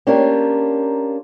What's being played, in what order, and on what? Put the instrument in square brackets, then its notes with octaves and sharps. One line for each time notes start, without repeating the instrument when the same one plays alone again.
[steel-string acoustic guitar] A#3 C#4 D4 F4 G4 A#4